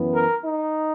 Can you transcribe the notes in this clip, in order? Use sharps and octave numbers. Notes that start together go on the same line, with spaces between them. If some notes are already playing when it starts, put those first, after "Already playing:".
Already playing: F#2 E3 B3
A#4
D#4